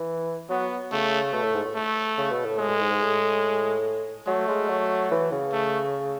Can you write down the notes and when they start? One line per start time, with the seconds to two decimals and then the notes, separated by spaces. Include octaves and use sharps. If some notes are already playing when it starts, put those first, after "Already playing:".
Already playing: E3
0.49 F#3 B3
0.92 C#3 A3
1.33 B2 A3
1.43 A2
1.54 G#2
1.64 A2
1.75 A3
2.18 C#3
2.31 B2
2.45 A2
2.59 A2 G#3
2.70 A2
2.80 G#2
2.90 G#2
3.01 A2
4.27 F#3 A3
4.48 G#3
4.69 F#3
5.11 E3
5.32 C#3
5.52 A3